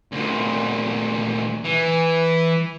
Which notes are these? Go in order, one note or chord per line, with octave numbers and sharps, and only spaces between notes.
D2 A#2
E3